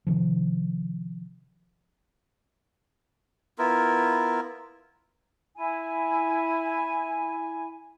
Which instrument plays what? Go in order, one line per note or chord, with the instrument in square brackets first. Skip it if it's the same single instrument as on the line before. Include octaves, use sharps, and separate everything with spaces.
[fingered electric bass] C3 D#3 F3
[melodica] B3 E4 F4 A#4
[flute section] E4 G#5